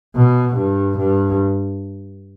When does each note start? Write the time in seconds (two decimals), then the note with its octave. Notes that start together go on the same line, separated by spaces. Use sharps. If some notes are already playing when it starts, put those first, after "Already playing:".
0.16 B2
0.56 G2
0.98 G2